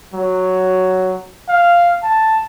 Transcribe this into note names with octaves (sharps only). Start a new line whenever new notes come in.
F#3
F5
A5